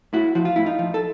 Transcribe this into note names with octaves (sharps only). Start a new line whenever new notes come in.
A2 E4 F#4
F3 F#4
F4
A2 E4
D#4 F4
F3
A4